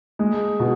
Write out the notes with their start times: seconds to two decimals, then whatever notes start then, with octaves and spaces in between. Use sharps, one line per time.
0.19 G#3
0.60 B2